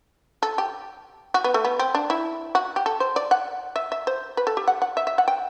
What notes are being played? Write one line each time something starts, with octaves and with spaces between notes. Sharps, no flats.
A4
G4
F#4
B3
A3
B3
C4
D4
E4
F#4
G4
A4
C5
D5
F#5
E5
E5
C5
B4
A4
G4
F#5
F#5
E5
E5
F#5
G5